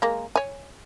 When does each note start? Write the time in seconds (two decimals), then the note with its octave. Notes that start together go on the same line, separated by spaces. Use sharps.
0.02 G#3 A#3
0.36 C#5 G#5